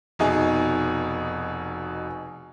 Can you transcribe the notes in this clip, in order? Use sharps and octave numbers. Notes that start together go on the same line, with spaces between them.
F1 B2 D#4 G#4